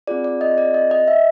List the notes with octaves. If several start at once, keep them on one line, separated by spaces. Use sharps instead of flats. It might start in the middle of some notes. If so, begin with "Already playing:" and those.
C4 F4 G#4 D5
D5
D#5
D5
D#5
D#5
E5